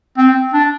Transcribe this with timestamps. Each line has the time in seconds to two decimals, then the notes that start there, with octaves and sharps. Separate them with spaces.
0.18 C4
0.53 D4